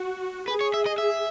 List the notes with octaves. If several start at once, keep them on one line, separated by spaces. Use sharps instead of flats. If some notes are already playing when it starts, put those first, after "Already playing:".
Already playing: F#4
G#4 B4
C#5
E5
D#5
E5